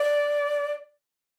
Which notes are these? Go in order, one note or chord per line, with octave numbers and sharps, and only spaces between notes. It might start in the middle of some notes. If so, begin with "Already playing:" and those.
Already playing: D5